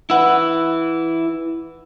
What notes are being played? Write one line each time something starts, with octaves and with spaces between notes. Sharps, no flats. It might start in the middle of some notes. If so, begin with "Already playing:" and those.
E4 B4 F#5 E6